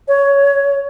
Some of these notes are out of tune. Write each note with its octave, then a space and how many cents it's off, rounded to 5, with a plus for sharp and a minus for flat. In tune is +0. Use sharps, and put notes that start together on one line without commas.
C#5 +10